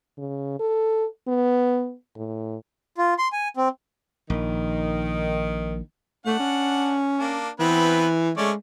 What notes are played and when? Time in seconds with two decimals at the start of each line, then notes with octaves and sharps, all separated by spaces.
0.18 C#3
0.59 A4
1.28 B3
2.16 A2
2.98 F4
3.18 C6
3.32 G#5
3.57 C4
4.30 A#1 D#3
6.26 A3 D4 F#5
6.39 C#4
7.18 A#3 D4
7.60 E3 B3 C4 B4
8.37 G#3 A3 C#4 D5